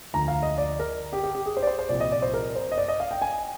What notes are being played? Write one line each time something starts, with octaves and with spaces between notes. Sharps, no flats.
D2 D3 F3 A#5
F5
D#5
D5
A#4
G4
G4
G4
G#4
C5
D5
C5
C5
C2 A#2 F3 D5
D#5
D5
C5
A#4
C5
D#5
D5
D#5
F5
G5
G#5